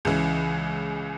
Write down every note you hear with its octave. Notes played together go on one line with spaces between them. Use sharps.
C#2 C#3 E3